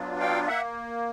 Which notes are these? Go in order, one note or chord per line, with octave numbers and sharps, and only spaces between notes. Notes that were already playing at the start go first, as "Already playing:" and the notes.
Already playing: F#3 B3 D4 F4
F5 G5
A#3 E5 F#5